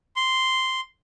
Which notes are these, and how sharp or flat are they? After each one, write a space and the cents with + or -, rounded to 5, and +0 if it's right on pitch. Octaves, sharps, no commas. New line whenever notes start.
C6 -5